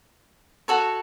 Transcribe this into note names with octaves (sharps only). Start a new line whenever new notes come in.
F#4 A4 C#5